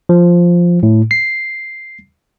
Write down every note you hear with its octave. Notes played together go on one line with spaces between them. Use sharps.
F3
A2
C7